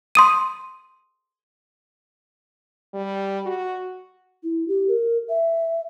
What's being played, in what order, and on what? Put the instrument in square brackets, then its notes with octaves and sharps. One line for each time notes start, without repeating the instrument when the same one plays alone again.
[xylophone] C6 D#6 D#7
[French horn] G3
F#4
[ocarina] E4
G4
A#4
E5